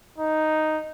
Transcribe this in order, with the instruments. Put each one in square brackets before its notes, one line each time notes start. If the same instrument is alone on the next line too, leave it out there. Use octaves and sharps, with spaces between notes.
[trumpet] D#4